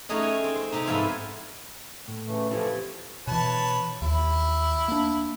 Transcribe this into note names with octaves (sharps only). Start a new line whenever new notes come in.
A3 C#4 D#4 G#4 D#5 F#5
G#5
C4
C5
C3 C4 D#4
G#2 B3 A4 E5 F5 G#5
A2
C#3 E3 A3
E3 F3 C4 E4 G4 A4
B2 E3 B4 C#5 A5
D#2 E4
A#3 D4